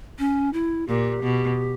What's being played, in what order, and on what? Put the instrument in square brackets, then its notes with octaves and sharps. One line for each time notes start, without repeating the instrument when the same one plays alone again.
[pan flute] C#4
E4
[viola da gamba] A#2 [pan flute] G4
[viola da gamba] B2